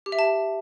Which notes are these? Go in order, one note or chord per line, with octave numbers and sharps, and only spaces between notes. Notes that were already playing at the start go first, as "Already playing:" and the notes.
G4
E5
A5